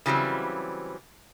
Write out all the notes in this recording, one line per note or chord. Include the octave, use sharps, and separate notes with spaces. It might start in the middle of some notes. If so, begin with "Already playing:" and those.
C#3 E3 F#3 G3 C4